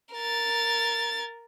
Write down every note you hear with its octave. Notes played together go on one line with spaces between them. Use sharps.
A#4 A6